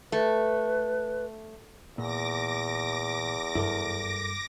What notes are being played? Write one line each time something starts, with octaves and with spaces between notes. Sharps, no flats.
A3 B4
E2 A#2 D6 A#6
F#1 G2 E4 A4 A#4